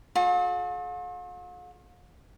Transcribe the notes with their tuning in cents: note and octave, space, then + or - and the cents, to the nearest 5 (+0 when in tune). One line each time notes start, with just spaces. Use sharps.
F4 +45 A4 -45